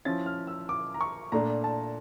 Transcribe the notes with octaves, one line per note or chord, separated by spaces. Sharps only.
F3 C#4 E4 A6
F6
E6
D6
A#5
C#6
A#2 A3 D4 A#5
A5